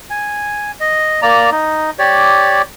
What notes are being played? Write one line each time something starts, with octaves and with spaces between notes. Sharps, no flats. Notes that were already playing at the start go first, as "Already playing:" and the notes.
G#5
D#5
A#3 D5 A#5
D#4
G4 C#5 D5